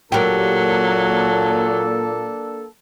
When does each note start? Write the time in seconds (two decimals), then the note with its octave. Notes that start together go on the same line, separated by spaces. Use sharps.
0.12 A#2 F#3 A#3 D4 G4 A4 A#4